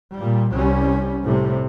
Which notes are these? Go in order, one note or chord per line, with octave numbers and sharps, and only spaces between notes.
A#2 G3
C2 G3 C#4
A2 C3 G3